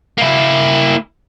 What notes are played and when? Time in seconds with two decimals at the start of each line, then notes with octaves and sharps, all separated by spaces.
0.18 A#3 E4